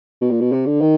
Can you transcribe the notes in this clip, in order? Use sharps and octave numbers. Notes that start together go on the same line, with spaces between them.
B2
A#2
B2
C3
D3
D#3